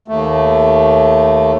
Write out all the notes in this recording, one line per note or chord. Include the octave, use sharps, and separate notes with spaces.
D#2 A3